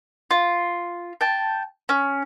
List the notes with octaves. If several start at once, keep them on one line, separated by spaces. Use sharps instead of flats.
F4
G5 A5
C#4